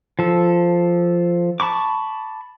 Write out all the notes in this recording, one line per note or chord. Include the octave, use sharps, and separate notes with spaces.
F3 A4
A5 B5 C#6 D6